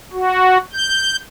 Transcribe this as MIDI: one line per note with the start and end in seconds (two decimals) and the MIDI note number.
0.13 0.58 66
0.73 1.16 91